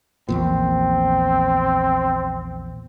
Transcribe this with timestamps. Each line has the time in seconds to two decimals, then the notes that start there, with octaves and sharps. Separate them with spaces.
0.29 A#1 E2 A#2 C4